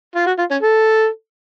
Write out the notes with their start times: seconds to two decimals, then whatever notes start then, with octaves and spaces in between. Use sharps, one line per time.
0.16 F4
0.27 F#4
0.38 F4
0.51 C#4
0.62 A4